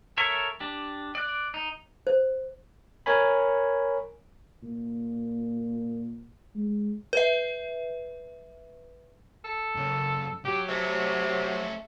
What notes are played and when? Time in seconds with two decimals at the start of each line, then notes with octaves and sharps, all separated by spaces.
0.17 A4 A#4 C#5 E5
0.60 D4 G4
1.15 D5 F#6
1.54 D#4
2.07 C5
3.06 A#4 C#5 G#5 B5
4.63 A#2
6.55 G#3
7.13 B4 E5
9.44 A4
9.75 F#2 C#3
10.45 F#3 G4
10.69 C3 A3 C#4